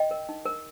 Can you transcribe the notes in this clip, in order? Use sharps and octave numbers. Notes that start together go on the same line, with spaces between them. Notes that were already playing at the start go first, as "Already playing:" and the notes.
Already playing: D#5 G5
A#4
D#4
A#4